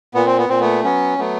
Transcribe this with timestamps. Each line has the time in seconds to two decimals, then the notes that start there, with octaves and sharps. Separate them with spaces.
0.14 A#2 B3
0.26 C4
0.38 B3
0.49 A#2 C4
0.61 A3 B3
0.84 F#3 B3 C#4
1.18 F#3 A3 B3